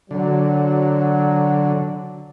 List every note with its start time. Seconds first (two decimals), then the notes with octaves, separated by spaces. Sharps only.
0.11 D3 F#3